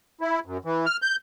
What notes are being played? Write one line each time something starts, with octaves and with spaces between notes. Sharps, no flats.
E4
F#2
E3
F6
G6